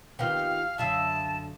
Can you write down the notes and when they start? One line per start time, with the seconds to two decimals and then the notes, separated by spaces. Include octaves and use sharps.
0.19 D#3 B3 F4 G4 F5
0.78 F#2 D3 E5 F5 A5 D#6 E6